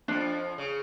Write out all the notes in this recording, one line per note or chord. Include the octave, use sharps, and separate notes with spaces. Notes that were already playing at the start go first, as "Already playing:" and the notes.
F2 F3 D4
C#3